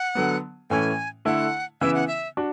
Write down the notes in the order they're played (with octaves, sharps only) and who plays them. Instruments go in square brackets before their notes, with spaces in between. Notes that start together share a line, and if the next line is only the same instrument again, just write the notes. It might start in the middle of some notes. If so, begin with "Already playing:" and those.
Already playing: [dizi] F#5
[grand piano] D3 F#3 B3
[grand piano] A2 E3 A3 C#4 [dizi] G#5
[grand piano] D3 A3 E4 [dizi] F#5
[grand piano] C#3 E3 B3 E4 [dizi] E5
[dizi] F#5
E5
[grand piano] D4 F#4